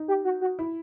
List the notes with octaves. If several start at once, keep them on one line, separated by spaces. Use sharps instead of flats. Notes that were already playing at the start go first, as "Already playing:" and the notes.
Already playing: D#4
G4
F#4
F#4
E4